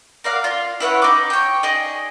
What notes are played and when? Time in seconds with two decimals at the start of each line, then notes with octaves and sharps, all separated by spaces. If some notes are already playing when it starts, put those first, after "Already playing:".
0.24 A#4 D5 F5 F#5
0.44 F4
0.80 E4 B4 C#5 F#5
1.02 D#4 D6
1.30 C#5 G5
1.63 D#4 G#4 D5 D#5